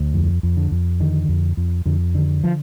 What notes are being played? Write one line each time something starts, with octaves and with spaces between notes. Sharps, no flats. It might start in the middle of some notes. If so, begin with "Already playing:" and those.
Already playing: D2
F2
F2
D3
F2
D3 D#3
F2
F2
F2 D3
D3 D#3
F3